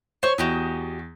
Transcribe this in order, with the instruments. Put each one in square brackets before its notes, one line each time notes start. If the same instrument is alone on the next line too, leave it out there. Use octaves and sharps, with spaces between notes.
[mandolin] C5 C#6 [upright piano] C#5
[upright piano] E2 [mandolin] F#4 G4 D#5